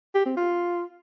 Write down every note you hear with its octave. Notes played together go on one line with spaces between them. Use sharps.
G4
C4
F4